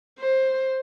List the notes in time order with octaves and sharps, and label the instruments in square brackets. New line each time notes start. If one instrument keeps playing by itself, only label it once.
[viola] C5